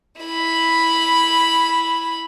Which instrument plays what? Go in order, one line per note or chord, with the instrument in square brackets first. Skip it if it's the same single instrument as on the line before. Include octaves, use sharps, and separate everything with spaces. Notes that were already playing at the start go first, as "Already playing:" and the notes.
[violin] E4 B5